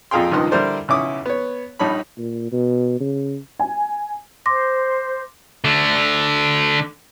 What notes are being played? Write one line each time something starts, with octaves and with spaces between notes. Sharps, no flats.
F2 A#2 G#4 F5 G5 C6
C#2 G2 D#3 F3 D#5 C6
D3 G3 E4 A#4 C5 D5
B1 C#3 C#4 E4 D6 D#6
B3 C#5
A#1 G3 D#4 C#5 A5 B5
A#2
B2
C#3
G#5
C5 C6 D6 A#6
D3 A3